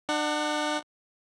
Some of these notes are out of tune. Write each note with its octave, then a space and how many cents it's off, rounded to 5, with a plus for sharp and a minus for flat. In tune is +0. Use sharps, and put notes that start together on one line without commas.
D4 +40 F#5 +0